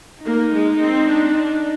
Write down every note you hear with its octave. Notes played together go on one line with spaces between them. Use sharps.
A#3 D#4
G#3
C4
D4
D4